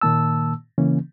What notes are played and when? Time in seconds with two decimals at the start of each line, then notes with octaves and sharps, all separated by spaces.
0.02 A#2 D#3 A#3 A5 E6
0.78 C#3 E3 A#3 C#4